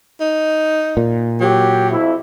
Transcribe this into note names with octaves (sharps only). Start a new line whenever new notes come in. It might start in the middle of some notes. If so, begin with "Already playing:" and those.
D#4
A#2
F#3 G4
F2 E4